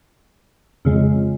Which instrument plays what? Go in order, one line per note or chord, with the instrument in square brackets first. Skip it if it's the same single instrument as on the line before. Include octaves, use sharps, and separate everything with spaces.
[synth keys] F2 C#3 G#3